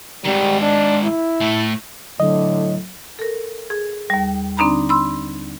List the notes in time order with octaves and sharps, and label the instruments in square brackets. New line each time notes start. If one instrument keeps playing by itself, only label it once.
[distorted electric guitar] G#2 D#3 [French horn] G3
[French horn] D4
E4
[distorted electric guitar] A2 A3
[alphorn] A2 [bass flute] D3 [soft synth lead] F#3 [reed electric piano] D#5
[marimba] A4 A#4
G#4
D#2 G3
D3 C4 D4 D#4 A#5 B5
B5 C6 E6